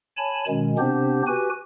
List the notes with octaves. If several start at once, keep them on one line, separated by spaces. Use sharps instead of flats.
C#5 G#5 A5 B5
B2 D#3 G#3 C#4
C3 B3 C4 D4 G4 C5
F#4 G4 B4 G#5